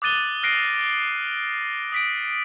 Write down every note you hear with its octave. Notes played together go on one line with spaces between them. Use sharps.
D6 D#6 F#6 A6 D#7 G7
F6 F#6 A#6 C7 D7
D#6 B6 D7